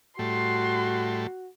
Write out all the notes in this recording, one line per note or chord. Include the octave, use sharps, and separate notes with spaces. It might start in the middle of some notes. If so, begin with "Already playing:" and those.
A2 G3 A3 F#4 C6